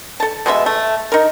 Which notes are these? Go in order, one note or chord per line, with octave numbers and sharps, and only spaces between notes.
A4 A5
B2 G#3 C#4 E5
A3
D#4 A#4